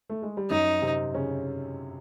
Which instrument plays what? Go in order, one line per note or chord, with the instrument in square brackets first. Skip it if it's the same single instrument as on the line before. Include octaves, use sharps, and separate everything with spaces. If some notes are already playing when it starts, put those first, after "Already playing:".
[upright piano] A3
G#3
G3
[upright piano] F#2 F#3 [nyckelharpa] D#4
[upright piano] C3 C4
C#3 C#4